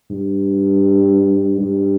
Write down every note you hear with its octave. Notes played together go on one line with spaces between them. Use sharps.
G2
G2